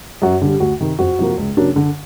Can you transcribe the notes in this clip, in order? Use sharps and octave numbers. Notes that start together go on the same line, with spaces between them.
F#2 F#4
D3 G3
D2 F#4
C3 D#3
F2 F#4
C3 F3 A#3
C#2
C#3 F#3 A#3 D4
D3